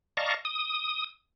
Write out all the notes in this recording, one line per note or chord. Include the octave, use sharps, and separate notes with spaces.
D5 D#5 F5 A5 A#5 C#6
D#6